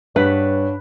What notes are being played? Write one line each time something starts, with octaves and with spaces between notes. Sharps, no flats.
G2 D4 B4 C#5 F#5 F#6 B6